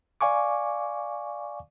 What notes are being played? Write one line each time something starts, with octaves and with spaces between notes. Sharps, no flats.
D5 F5 G#5 C#6 D6